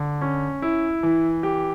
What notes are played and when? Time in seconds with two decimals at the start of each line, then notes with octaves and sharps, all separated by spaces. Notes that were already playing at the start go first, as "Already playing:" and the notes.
Already playing: D3
0.21 C#4
0.62 E4
1.03 E3
1.43 G4